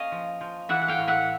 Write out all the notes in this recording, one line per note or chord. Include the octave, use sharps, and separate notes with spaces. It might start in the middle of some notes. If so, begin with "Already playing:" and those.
Already playing: A#3 C#4 D#5 F5
F3
F3
E3 E5 F#5
F#5
F5 G5
A2
E5 F#5